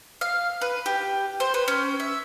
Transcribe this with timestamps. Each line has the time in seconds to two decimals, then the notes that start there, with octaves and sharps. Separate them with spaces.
0.21 F5
0.61 B4
0.86 G4
1.40 C5
1.54 B4
1.68 C#4
2.00 E5